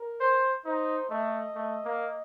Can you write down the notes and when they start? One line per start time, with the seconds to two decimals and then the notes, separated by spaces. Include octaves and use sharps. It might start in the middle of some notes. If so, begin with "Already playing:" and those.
Already playing: A#4
0.20 C5
0.65 D#4 C5
1.09 A3 D#5
1.55 A3
1.85 A#3